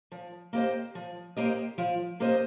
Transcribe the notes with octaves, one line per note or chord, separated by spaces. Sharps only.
F3
A#3 G4 C5 D#5
F3
A#3 G4 C5 D#5
F3
A#3 G4 C5 D#5